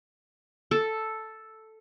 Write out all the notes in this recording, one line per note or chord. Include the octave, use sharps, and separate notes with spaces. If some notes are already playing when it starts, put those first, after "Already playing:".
A4